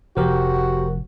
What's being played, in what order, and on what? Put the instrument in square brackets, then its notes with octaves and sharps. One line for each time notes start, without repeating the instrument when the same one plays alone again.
[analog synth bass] F1 [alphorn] F#4 [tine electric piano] G4 A#4 C5